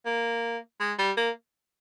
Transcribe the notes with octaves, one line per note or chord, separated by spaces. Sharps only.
A#3
G#3
G3
A#3